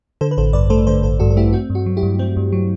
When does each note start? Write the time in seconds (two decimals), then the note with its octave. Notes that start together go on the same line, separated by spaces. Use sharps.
0.21 D3 A4 C5
0.31 B4
0.37 A1 A4 C5
0.53 G2 B4 D5
0.70 A3 A4 C5
0.87 D3 A4 C5
1.03 A1 A4 C5
1.20 G2 F#4 A4
1.30 A4
1.37 A3 E4 G4
1.53 C4 F#4
1.70 G2
1.75 F#4
1.86 F#3
1.97 E4 G4
2.03 G2
2.19 C4
2.37 G2
2.52 F#3